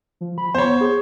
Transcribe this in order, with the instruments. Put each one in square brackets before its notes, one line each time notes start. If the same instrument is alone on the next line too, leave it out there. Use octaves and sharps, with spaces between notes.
[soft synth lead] F3
B5
[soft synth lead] B3 [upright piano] C5 C#5
[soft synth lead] G#4